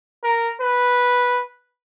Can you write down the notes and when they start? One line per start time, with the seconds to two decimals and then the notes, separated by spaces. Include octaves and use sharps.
0.23 A#4
0.62 B4